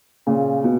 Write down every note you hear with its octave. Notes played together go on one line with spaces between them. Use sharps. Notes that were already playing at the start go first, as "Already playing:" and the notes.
A#2 C#3
B2